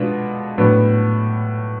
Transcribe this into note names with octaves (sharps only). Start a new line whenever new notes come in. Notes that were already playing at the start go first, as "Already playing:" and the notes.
Already playing: B2 G#3 B3 D4 F4
A2 F#3 B3 D4